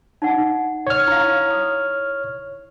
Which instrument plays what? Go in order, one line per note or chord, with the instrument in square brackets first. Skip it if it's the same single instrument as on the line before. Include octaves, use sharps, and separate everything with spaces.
[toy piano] D#4 D5 F#5
[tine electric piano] C#5 F6
[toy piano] E4 F5
D#6